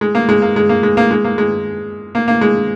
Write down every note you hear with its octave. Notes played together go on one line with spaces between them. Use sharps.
G#3
A#3
G#3
A#3
G#3
A#3
G#3
A#3
G#3
A#3
G#3
A#3
A#3
G#3